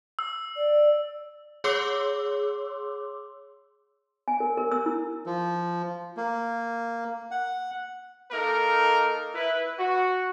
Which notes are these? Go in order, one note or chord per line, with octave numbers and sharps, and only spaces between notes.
E6
D5
G#4 C#5 C6 D6 E6
G#5
A#4
A#4
E6
E4
F3
A#3
F#5
A#3 D#4 A4 A#4
E4 B4
F#4